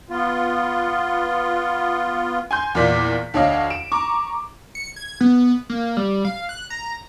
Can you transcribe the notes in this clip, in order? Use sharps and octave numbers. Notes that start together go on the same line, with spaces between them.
B3 F4
G#5 C6 G6
E2 A#2 F4 D5 B6
D2 D4 C#5 D#5 F5
D7 E7
A#5 C#6 D6
C#7
G#6
B3
A#3
G3
F5
F#6
A#5